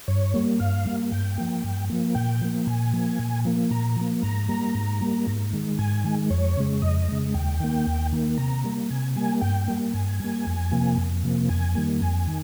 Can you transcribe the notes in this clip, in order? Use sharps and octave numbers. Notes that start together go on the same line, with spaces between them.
G2 C#5
G3 A#3
G2 F5
G3 A#3
G2 G5
F3 A#3
G2
F3 A#3
A#2 G5
F3 A#3
A#2 G#5
F3 A#3
A#2
F3 A#3
A#2 A#5
F3 A#3
G#2 A#5
G3 A#3
G#2
G3 A#3
G#2
D#3 G#3
G#2 G#5
D#3 G#3
F2 C#5
C#3 G#3
F2 D#5
C#3 G#3
D#2 G5
D#3 A#3
D#2
D#3 A#3
C3 A#5
G3 A#3
C3 G#5
G3 A#3 G#5
G2 G5
G3 A#3
G2 G#5
G3 A#3
F2
C3 F3 A#3
F2
C3 F3 A#3
F2 G#5
D#3 G3 A#3
F2 G#5
D#3